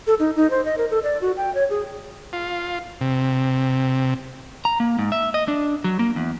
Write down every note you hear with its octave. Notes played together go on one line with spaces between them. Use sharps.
A4
D#4
D#4
C5
D#5
A#4
A4
D5
F#4
G5
C#5
G#4
F4
C3
A#5
A#3
G#2
E5
D#5
D4
F#3
A#3
E2